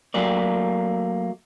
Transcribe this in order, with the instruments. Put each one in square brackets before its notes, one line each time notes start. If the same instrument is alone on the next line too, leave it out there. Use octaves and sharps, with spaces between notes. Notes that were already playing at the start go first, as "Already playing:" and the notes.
[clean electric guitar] F#3 A3 A#3 D5